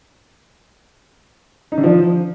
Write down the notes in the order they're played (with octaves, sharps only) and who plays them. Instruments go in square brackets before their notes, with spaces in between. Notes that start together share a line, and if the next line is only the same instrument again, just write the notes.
[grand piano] D#4
D3
F3